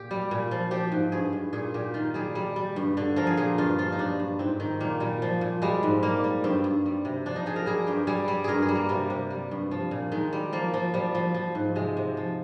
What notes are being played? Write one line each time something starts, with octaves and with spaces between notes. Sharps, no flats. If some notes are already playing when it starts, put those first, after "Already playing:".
Already playing: A#2 G4
G3
A#2
F3
F3 G4
G#2
G2 G#4
G2
A#2 G#4
A#2 G4
D#3 F4
G3 G#4
G3
G3
G2
D3
F3 A#4
G#4
A#2 G#4
G2 F4
F3 F4
D#4
G2 D4
G2
G#2 C4
D#3
A#2 A#3
A#2 G3
F3
A#2
G3 G#3
G#2
G3 A#3
G3
G2 C4
G2
G3
C3
F3 D4
D#4
F3 G#4
A#4
G3 G#4
G2 G4
G3 G#4
G3
G2 G#4 A#4
G#4
G3
A#3
C3 G3
C3
G3
G2
F3
A#2
D#3 G#3
G3
F3 A#3
F3
F3 G3
F3
F3
G#2
C3 G#3
C3
F3